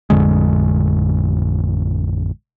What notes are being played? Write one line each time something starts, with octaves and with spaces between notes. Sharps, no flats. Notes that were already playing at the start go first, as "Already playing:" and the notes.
A1 F2 D3 G#3